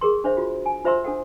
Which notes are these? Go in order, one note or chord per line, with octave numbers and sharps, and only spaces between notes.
G#4 A#4 C6
D4 C5 C#5 E5
F4 F#4
G#5
F4 C5 E5 A#5 C6 E6
D4 A4 F#5